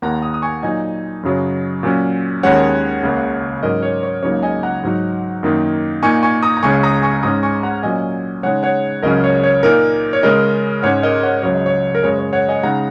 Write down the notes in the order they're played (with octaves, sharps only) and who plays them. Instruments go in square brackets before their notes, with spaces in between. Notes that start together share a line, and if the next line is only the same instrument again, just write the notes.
[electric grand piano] D#2 D#3 A#3 F#5 A#5
A#5 D#6
D#6
G#5 C#6
A#2 F#3 D#4 D#5 G#5
F#2 C#3 F#3
A#2 F#3 C#4
D#2 D#3 G#3 C#4 C#5 F#5
C#2 C#3 A#3
G#2 F#3 C#4 A#4 D#5
C#5
C#5
C#2 C#3 F#3 A#3 D#4 C#5
D#5 G#5
F#5 A#5
G#2 F#3 D#4
F#2 D#3 A#3 D#4
A#2 A#3 D#4 G#5 C#6
G#5 C#6
A#5 D#6
A#5
C#2 C#3 G#3 C#4 G#5 C#6
A#5 D#6
G#5 C#6
G#2 G#3 C#4 A#5 D#6
G#5 C#6
F#5 A#5
A#2 F#3 C#4 D#5 G#5
C#3 G#3 D#4 C#5 F#5
C#5 F#5
C#2 C#3 F#3 C#4 A#4 D#5
C#5
C#5
A#2 A#3 D#4 A#4
C#5
C#3 G#3 C#4 A#4 D#5
G#2 G#3 C#4 C#5 F#5
A#4 D#5
C#5 F#5
C#2 C#3 F#3 C#5
D#5
C#5
A#4
F#2 C#3 G#3 C#5
C#5
C#5 F#5
D#5 G#5
C#3 G#3 D#4 F#5 A#5